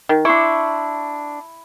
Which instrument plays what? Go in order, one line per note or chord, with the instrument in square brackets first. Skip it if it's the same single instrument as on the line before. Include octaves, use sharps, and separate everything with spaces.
[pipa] D#3
[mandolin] D4 C6 C#6 [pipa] E4